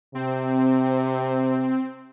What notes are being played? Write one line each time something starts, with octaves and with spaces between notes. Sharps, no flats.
C3 C4